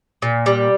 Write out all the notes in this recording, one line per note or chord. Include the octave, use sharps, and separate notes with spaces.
A#2
G3